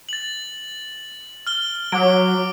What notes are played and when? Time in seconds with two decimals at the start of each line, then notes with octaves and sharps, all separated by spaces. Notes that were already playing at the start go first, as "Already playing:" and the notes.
0.09 A6 F#7
1.47 F6 G7
1.92 F#3 D6 D7